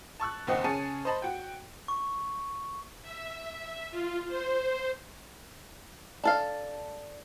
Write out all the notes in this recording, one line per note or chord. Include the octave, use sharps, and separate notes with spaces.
A5 C#6 E6 F#6
F#1 D#2 C4 C5 D#5 F#5
C#3 G#4 C#5 A5 C#7 D#7
C5 D#5 A5 B5
F#4 G5
C#6
E5
F4
C5
D4 A4 F5